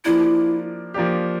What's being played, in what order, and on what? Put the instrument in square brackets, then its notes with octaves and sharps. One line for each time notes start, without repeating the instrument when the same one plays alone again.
[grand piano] F3 A#3 D4 G4 [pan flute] E4
[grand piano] F3 A#3 D4 G4